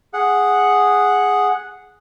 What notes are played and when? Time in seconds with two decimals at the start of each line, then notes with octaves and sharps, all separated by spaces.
0.14 G#4 F#5